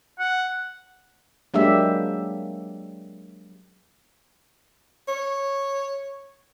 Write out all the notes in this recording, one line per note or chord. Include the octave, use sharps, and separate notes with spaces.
F#5
F#3 G#3 A#3 D4 G4 E5
C#5